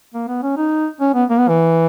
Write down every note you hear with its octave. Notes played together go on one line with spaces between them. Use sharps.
A#3
B3
C#4
D#4
C#4
B3
A#3
B3
E3